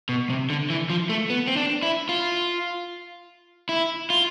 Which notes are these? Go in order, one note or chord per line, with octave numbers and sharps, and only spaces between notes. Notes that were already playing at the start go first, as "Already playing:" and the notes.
B2
C3
D3
E3
F3
A3
B3
C4
D4
E4
F4
E4
F4